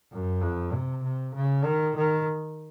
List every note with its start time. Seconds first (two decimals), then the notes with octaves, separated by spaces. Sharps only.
0.12 F#2
0.42 F2
0.73 C3
1.03 C3
1.35 C#3
1.64 D#3
1.96 D#3